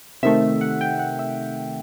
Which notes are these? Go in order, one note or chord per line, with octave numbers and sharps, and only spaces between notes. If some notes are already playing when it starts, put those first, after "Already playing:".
C3 D#3 A3 E5
F#5
G5
F#5
E5